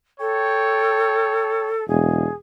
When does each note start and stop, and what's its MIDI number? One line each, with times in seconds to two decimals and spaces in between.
0.20 1.86 69
0.20 1.70 73
0.20 1.70 79
1.88 2.26 28
1.88 2.34 68